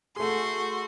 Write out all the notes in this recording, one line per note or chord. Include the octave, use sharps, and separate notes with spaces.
A3 F#4 G#4 C6